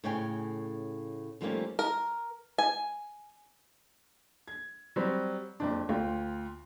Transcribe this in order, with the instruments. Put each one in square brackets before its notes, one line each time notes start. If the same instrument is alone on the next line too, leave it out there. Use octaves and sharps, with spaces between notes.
[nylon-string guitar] A2 C#3 C#5 G5 G#5
D#2 F3 G3 A3 A#3 C#4
[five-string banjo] A#4
G#5
[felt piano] G#6
F#3 G3 C4
F#1 F2 D4
D2 F4 G5